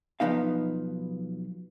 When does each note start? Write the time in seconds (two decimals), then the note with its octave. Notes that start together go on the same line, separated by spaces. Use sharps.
0.20 B1 G2 F3 B3 D#4 F5